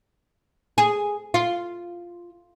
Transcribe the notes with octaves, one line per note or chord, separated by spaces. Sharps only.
G#4
F4